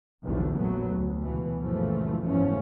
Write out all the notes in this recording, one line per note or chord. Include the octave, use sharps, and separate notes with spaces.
F1 B1 E2 D3 A3
F1 A#1 F#3 A3 B3
D2
C#2 B2 E3
C#2 F#2 A#2 E3 F3 A3
F#1 E2 G#2 F3 A3 C#4